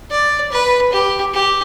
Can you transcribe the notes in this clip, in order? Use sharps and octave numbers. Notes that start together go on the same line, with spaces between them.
D5
B4
G4
G4